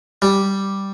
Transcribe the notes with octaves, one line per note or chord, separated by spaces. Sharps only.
G3